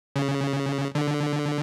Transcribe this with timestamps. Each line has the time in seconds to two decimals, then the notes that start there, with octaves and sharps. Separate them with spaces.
0.16 C#3
0.95 D3